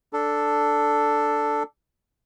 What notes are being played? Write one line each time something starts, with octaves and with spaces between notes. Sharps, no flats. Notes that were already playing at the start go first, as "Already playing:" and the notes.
D4 A4